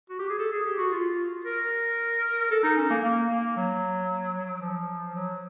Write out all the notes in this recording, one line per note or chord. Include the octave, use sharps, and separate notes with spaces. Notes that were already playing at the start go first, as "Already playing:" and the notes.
F#4
G4
G#4
A4
G#4
G4
F#4
F4
A#4
A4
D#4
C#4
A#3
A#3
A#3
F#3
F3
F#3